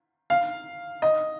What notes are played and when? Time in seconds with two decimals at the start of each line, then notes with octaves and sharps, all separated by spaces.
0.30 F5
1.02 D#5